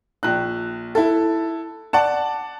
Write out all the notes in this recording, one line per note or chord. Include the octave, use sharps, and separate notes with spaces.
A#1 F#6
E4 A4
D5 F#5 A5